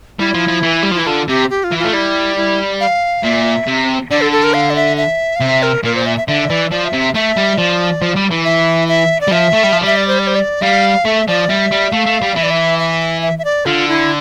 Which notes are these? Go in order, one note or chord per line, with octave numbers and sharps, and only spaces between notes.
G3 E4
F3
F3
E3
G3
F3
E3 E4
D3 F4
C3 G4
G4
F4
E3
F4
A3
G3 E4
E4
F5
A#2 E5
C3
D3 D5
A4
A4
A#4
F5
D5
E5
E5
F5
C3 E5
A#4
A#2 A#4
C5
E5
E5
D3 E5
E3 D5
F3 D5
E5
C3
E5
A3 E5
G3
F3 D5
F3
G3
E3
E5
E5
D5
G3
F3 E5
A3
G3
F3
G3
E5
D5
C5
D5
C5
D5
G3 F5
A3 E5
F3 D5
G3 E5
G3
A3 F5
A3
G3
E3 E5
D5
E5
E5
E5
E5
D5
D3 F4
E4